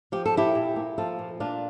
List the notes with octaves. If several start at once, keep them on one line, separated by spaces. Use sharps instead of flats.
F3 G4
A4
A#2 E4 G4
A#2
A#3
F3 F4 A4
A#2
A#2 D4 F4